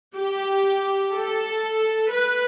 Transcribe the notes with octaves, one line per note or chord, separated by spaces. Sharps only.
G4
A4
B4